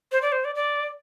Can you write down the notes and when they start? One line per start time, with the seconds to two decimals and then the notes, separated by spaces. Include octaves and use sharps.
0.12 C5
0.22 D5
0.32 C5
0.45 D5
0.55 D5